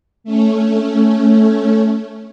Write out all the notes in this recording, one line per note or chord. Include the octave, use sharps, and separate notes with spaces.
A3 C#4